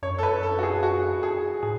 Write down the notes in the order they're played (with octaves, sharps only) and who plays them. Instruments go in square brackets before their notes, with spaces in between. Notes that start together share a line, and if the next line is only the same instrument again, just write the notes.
[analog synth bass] F#2 [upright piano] C#5
[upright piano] A4
B4
A4
F#4
G#4
F#4
G#4
[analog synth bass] A2 [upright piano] G#4